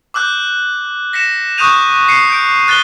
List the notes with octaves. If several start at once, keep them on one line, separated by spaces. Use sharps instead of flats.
D6 E6 F#6 G6
A#6 B6 C#7 E7
C#6 D#6 F#6 G6 D#7 F7
C7 C#7 D#7
G6 D7
F#6 A6 B6 G7